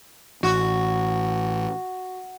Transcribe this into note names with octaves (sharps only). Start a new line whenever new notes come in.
A1 F#4